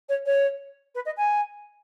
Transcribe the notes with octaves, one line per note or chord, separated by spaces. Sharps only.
C#5
C#5
B4
D#5
G#5